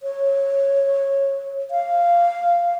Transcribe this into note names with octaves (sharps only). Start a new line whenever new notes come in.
C#5
F5